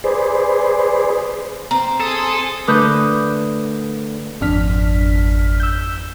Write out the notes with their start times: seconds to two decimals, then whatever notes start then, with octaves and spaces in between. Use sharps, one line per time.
0.04 G#4 B4 C5 D5
1.71 C4 A#5
2.00 G#4 A4 C6 D#6
2.67 D3 A3 A#4 B4 D#6 G6
4.41 G#1 F2 D4 F6 B6
5.60 E6 G6